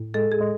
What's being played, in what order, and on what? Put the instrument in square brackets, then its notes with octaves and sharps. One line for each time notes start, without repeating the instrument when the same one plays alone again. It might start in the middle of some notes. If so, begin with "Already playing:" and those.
Already playing: [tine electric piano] A2
[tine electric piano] G#3 [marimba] A4
[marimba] G#4
[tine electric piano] G#3